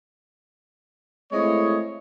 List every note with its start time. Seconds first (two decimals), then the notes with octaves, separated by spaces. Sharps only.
1.32 G#3 A3 C4 E4 C#5 D#5